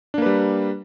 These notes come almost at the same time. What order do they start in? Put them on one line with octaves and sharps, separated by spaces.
D4 A#3 B4 G3